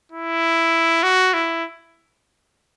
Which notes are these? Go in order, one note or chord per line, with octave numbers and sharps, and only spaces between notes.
E4
F#4
E4